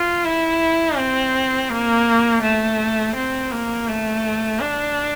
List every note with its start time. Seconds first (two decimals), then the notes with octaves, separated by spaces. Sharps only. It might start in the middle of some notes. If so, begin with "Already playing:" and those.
Already playing: F4
0.25 E4
0.97 C4
1.70 A#3
2.42 A3
3.16 C4
3.52 A#3
3.89 A3
4.61 D4